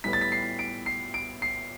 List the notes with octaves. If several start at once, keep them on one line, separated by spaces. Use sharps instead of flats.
A2 G3 B3 B6
A6
B6
C7
D7
C7
D7
C7